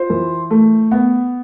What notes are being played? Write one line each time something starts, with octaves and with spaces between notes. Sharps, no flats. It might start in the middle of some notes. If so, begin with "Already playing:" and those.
Already playing: F4 C5
E3
A3
B3